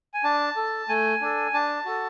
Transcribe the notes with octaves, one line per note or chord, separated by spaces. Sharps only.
G#5
D4 A5
A4
A3 G#5
D4 A4
D4 A5
F#4 A4